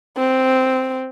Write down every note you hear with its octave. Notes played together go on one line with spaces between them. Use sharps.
C4